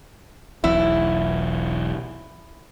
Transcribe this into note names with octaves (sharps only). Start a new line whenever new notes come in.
E1 B1 E3 E4